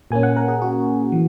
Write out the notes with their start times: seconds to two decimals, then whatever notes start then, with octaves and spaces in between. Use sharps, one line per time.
0.11 A#2 A#3 C#4 G#5
0.23 F#5
0.37 A#4
0.48 G#4
0.62 F#4
1.12 E3